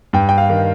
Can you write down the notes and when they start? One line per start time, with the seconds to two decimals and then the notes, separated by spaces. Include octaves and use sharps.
0.13 G2 G5
0.29 G5
0.38 F5
0.49 D#3